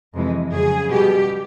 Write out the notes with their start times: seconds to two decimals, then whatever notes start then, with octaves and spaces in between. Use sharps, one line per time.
0.14 F2 C3 E3 G#3
0.52 F2 C#3 F#3 G#4
0.89 B2 G3 G4